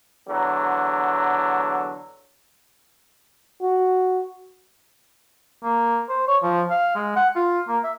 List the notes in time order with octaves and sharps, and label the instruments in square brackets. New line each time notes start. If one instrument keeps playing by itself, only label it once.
[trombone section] E2 D3 F#3
[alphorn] F#4
[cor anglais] A#3
C5
C#5
F3
F5
G#3
F#5
F4
A#3
E5